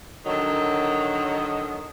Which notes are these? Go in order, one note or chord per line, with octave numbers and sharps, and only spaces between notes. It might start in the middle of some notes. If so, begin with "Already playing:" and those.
D3 D#3 F#3